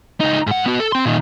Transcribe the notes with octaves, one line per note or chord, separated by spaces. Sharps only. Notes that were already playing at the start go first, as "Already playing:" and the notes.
C#2 D#4
G#2 F#5
B3 F#4
A4
C4 C6
A#2 D#3